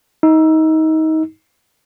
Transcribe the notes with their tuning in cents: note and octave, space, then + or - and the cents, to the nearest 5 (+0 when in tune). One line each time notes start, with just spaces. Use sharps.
D#4 +25 E6 +10